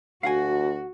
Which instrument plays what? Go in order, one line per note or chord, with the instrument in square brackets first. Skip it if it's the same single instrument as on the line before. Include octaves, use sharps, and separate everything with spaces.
[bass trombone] D2 [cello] F#4 [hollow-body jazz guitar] F5 F#5 G#5